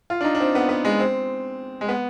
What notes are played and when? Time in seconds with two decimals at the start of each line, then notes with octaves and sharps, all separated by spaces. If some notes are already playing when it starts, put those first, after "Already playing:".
0.10 F4
0.21 D4
0.24 D#4
0.35 D4
0.40 C4
0.55 B3
0.69 B3
0.85 G#3
1.00 C4
1.81 G#3
1.89 B3